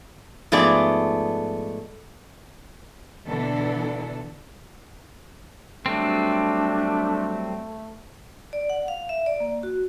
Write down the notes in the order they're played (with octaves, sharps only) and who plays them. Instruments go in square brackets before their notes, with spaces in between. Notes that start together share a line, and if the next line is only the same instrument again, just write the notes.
[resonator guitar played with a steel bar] G#2 F3 A3 B3 G#4 D5
[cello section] B2 D3 E3 D4 A4
[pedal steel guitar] F#3 G3 C4 [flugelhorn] A3 [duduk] D4
[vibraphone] D5
F#5
F5
E5
D5
A#3
F#4